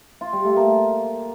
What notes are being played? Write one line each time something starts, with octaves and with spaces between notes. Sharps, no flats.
F4
G3
A3
A#3